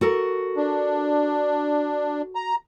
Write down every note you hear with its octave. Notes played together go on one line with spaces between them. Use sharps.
F#4 A4 A#4
D4
A#5